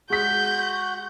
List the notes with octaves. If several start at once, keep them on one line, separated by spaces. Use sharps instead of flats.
G#3 F#4 G6 B6